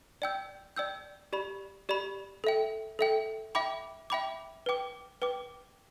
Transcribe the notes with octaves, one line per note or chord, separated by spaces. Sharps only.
D5 G5 E6 G6
D5 G5 E6 G6
G4 D5 B5
G4 D5 B5
A4 E5 G5
A4 E5 G5
E5 G5 B5 D6
E5 G5 B5 D6
B4 G5 D6
B4 G5 D6